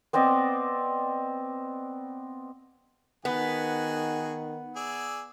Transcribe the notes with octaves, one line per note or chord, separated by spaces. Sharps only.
B3 C4 D5 D#5
D#3 B3 F#4 G#4
G#4 D5 E6